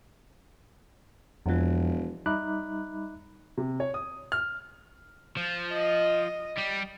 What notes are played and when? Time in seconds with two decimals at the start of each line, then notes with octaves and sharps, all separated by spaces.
1.46 E1 F2 F3
2.26 G3 D#4 E5 B5 D6 F#6
3.57 C3
3.80 C#5
3.94 D#6
4.32 F6
5.37 F3
5.73 D#5
6.58 G3